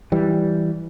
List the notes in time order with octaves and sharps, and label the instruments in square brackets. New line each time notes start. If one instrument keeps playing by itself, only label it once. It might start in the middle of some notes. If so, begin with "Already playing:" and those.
[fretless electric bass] E3 G3